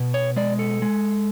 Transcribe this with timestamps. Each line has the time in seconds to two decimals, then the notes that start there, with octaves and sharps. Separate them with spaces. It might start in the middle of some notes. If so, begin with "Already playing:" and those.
Already playing: B2
0.14 C#5
0.36 G#3 D5
0.59 A4
0.82 G#3